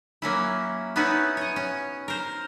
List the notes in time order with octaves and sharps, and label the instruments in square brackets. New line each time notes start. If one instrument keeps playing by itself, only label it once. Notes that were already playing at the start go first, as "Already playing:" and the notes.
[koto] F#3 A#3 C#4 E4
B3 C#4 D#4 E4 F#4
C#5 D#5
C#4
A#4 C5